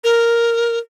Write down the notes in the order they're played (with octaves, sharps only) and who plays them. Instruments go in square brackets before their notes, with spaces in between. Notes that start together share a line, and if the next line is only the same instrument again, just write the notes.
[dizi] A#4